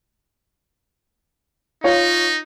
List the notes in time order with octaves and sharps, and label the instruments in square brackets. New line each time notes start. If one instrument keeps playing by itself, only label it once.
[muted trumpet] D#4 [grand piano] F4 C#5 F5